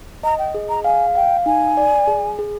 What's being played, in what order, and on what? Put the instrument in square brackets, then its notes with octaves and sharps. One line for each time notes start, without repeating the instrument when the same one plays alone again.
[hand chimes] D#5 [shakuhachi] A#5
[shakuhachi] G5
[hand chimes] G#4
[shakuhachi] A#5
[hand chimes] F5 [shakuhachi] G#5
[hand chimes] F5 [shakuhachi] G5
[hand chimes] D#4 [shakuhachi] G#5
[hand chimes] D5
G#4
G#4